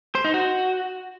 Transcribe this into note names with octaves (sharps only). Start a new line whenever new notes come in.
C5
D#4
F#4